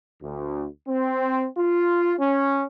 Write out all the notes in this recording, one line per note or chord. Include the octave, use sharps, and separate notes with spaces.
D2
C4
F4
C#4